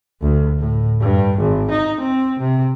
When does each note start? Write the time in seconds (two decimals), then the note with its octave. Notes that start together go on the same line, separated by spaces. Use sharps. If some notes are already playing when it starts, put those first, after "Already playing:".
0.21 D2
0.59 A2
1.00 G2
1.38 G#1
1.70 D#4
2.00 C4
2.40 C3